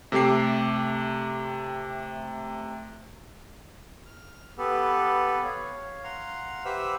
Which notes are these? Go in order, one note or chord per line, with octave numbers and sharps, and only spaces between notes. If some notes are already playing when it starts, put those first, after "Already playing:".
C3 A3 G4 D6 C7
F6
B3 G4 A4 B4
C#5 F5
F5 F#5 A#5 C6
G4 B4 C5 E5 F#5 E6